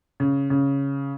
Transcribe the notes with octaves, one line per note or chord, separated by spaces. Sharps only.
C#3
C#3